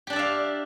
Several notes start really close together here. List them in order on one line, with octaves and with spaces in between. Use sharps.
G4 D4 D5 E5 F5